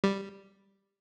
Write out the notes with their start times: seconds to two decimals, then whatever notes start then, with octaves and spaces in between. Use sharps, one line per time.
0.04 G3